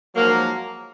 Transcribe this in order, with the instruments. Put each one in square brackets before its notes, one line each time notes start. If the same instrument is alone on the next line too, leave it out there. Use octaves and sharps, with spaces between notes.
[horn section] G#2 F3 F#3 A#3